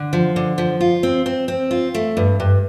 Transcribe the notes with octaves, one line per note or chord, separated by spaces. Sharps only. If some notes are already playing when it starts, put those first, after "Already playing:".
Already playing: D3
F3
D3
F3
F4
C4
C4
C4
F4
A3
G2
G2